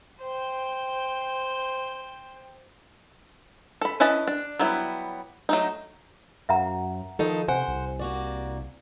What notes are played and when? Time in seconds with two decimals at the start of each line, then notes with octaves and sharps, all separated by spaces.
0.21 C5 G5
3.81 A4 B5
4.00 C#4 E4 B4 D#5 A5
4.27 D4
4.59 F#3 G3 B3 E4
5.49 F#3 A3 D#4
6.49 F#2 E5 F#5 A#5
7.19 D#3 F3 D#4 A4
7.48 C3 C5 F#5 G#5
7.68 C2
7.99 A#3 F#4 D5